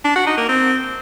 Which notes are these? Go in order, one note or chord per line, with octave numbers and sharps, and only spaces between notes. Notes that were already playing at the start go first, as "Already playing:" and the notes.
D4
F#4
D#4
A#3
C4